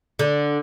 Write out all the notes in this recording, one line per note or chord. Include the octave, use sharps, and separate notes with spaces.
D3